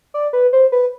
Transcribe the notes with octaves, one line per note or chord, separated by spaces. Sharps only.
D5
B4
C5
B4